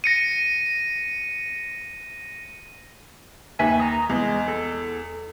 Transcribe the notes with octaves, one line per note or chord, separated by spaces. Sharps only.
A#6 C#7 D#7
D#2 B4 E5 G#5
A#5 D#6
E2 G#3
A4